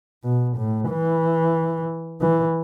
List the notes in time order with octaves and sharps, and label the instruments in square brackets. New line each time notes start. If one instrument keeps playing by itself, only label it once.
[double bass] B2
A2
E3
E3